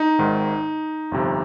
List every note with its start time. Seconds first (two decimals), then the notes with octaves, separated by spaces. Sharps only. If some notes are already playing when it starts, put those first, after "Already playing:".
Already playing: D#4
0.19 G#1 G#2 D#3
1.11 G1 F2 C3